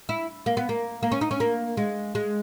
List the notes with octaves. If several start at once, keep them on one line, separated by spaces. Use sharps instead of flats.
E4
A#3
B3
A#3
A#3
C#4
D#4
C#4
A#3
G#3
G#3